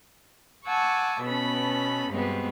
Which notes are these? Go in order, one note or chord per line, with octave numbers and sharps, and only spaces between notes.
F#5 G#5 A5 C#6 D6 E6
B2 B3 C#4 A4 B5
G2 B2 G#3 B3 C4